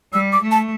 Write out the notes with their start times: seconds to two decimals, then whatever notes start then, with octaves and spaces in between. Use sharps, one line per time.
0.13 G3 E6
0.32 D6
0.41 A3
0.51 A5